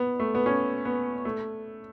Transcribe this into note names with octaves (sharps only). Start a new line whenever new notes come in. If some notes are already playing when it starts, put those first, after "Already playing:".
Already playing: B3
A3
B3
C#4
B3
A3